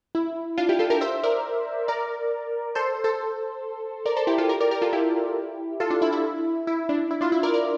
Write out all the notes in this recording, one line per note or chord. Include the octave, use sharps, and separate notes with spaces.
E4
D4 F4
E4 G4
F4 A4
G4 A#4
C5 E5
A#4 D5
A#4 D5
A4 C5
A4 C5
A#4 D5
A4 C5
E4 G4
F4 A4
G4 A#4
A#4 D5
G4 A#4
F4 A4
E4 G4
F4 A4
D4 F4
E4
E4
E4
D4
E4
D4 F4
E4
A#4 D5
A#4 D5